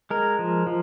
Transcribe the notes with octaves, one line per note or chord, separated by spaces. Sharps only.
G#3 A#4
F3
F3